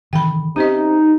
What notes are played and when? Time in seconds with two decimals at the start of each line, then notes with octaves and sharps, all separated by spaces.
0.13 C3 D#3 E3 G5 B5
0.56 C3 C#4 D#4 G4 C5 D#5